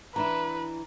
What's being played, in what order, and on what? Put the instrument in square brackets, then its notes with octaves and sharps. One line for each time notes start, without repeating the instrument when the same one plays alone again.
[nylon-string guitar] E3 D4 E4 [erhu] B4 [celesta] A#5